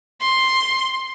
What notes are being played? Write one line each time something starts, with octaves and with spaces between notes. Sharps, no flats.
C6